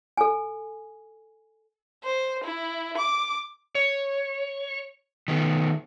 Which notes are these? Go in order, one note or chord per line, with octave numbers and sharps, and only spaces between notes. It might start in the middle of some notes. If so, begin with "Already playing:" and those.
A4 G#5
C5
E4
D6
C#5
D#3 A3 B3